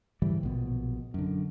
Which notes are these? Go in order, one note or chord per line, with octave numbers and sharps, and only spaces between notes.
G#2 D3 E3 G3
A#1 B2
F#2 D3